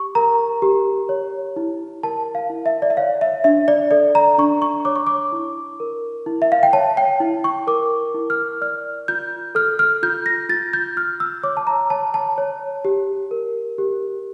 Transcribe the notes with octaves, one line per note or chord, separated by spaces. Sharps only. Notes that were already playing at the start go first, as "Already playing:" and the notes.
Already playing: G4 C#6
A#4 A#5
G4
C#5
E4
A#4 A5
F5
E4
E5
D5
E5
C#5 F5
E5
D4 E5
D5
A4 D5
A#5
D4 C#6
C#6
C#5 D6
C#6
D6
E4
A#4
E4
E5
F5
G5
C#5 A5
G5
E4
C#6
A#4 D6
E4
F6
D5 F6
F4 G6
A4 F6
F6
F4 G6
A#6
F4 A6
G6
F4 F6
E6
C#5 D6
A5
A#5
C#5 A5
A5
C#5
G4
A#4
G4